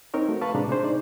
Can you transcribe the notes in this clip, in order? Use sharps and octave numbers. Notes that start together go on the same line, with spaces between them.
C4 D#4 A#4 C#5
A3 F#4
B4 F5 A5 B5 C#6
A2 C3 G#3 D4 G#4 A#5
C3 D4 G#4 C5
D#4 D5